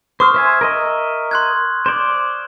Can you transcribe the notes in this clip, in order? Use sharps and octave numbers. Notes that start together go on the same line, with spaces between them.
C5 C#6 D#6 F6
C5 E5 G#5
A#4 D#5 E5
C6 F#6 G#6
C5 D5